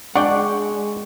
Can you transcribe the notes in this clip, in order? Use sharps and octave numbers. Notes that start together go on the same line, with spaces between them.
G#3 D4 D5 F#5 G5 C#6